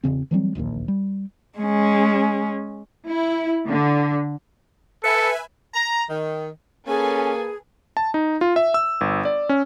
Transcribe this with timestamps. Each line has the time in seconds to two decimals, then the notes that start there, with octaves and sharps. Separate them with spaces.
0.04 E1 C2 C#3 C4
0.31 E3 F#3 G3 C4
0.55 D1 A#1 D#2 A#2
0.88 G3
1.58 G#3 C#4
3.06 E4
3.68 D3
5.04 A4 B4 E5 G#5 C#7
5.74 A#5
6.10 D#3
6.87 A#3 C#4 G#4 A4 B4 G#5
7.97 A5
8.14 D#4
8.41 F4
8.56 E5
8.74 E6
9.01 G1
9.25 D5
9.49 C#4